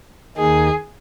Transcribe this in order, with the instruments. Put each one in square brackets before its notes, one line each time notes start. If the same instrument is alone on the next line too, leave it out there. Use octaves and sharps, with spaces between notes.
[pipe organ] D#2 D#3 A#3 D#4 [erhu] G#4